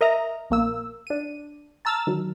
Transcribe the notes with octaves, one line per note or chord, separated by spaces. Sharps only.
A#4 D#5 E5 A#5
A#1 A#3 E6
D4 D#7
A5 A#5 E6 F6 A6
D#3 F#3